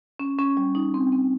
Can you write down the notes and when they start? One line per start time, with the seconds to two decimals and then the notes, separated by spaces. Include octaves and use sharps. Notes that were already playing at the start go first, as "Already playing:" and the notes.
0.20 C#4
0.38 C#4
0.57 G3
0.75 D#4
0.94 C4
1.12 C4